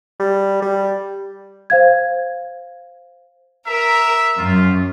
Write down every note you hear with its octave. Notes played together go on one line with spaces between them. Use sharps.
G3
G3
C5 F5 G#6
A#4 E5
F#2 F4